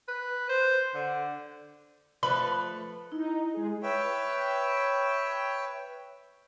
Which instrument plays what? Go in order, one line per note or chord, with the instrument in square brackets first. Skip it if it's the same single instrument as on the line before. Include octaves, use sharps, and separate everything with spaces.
[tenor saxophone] B4
C5
D3
[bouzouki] F3 A3 B4 [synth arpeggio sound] B5
[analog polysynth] D#4 [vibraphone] E4
[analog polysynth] G#3 G#4
[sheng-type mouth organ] B4 C#5 E5 G5